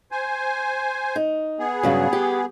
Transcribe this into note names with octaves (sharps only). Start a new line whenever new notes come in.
C5 G#5
D#4
B3 G#4
G2 C#3 F#3
G4